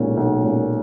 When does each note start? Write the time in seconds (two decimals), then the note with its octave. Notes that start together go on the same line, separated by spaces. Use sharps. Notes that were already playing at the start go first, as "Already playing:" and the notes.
Already playing: B1 A#2 G#3 C#4
0.17 B1
0.42 A#2 G#3 C#4